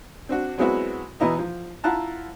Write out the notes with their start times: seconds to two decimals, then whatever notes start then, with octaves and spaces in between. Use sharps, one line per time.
0.29 C4 D4 F#4
0.58 F#3 G#3 B3 C4 E4 F#4
1.20 E2 B2 B3 E4 D#5 A#5
1.39 F3
1.84 E4 F4 F#5 A5 A#5